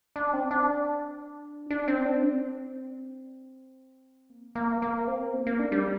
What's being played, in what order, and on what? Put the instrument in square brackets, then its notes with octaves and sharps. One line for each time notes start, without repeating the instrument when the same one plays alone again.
[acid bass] D4
C4
D4
D4
C4
D4
C4
A#3
A#3
A#3
C4
A#3
A#3
D4
G3